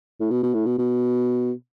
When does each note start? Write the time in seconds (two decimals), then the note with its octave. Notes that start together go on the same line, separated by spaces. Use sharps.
0.20 A2
0.31 B2
0.43 B2
0.54 A2
0.66 B2
0.78 B2